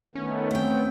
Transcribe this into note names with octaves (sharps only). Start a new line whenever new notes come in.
D#3 A3 B3 C#4
A3 B3 C4 G5